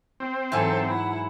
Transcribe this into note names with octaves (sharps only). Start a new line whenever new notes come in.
C4
G#2 E3 F#3 A4 E5 G#5 C6
E4 F#5